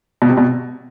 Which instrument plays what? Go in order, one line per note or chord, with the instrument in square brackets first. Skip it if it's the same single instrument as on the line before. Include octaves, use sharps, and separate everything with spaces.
[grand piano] B2
C3
B2